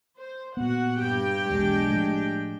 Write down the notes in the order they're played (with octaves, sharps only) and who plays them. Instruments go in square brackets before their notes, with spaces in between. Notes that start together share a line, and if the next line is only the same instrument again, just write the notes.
[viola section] C5
[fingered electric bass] A#2 B3 [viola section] F#4 F#5
[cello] G2 [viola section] G4 G5
[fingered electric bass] B1 E2 [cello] G#3 D4
[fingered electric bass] A2 F3 A3